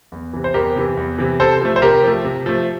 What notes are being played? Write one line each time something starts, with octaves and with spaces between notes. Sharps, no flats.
E2
C3 E3
C5
E2 G4 A#4
C3 E3
E2
C3 E3
C3 A4 C5
F3 A3
C5
C3 G4 A#4
F3 A3
C3
F3 A3